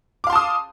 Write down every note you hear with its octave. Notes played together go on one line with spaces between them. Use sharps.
F5 A5 C6 D6 D#6